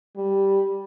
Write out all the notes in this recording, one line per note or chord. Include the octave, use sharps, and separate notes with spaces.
G3